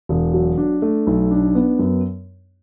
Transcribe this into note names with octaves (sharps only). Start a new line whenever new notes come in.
E1
F#3
D4
A3
B1
D4
B3
F#2